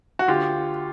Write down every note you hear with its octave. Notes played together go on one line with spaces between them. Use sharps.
F#4
D2 F4 G4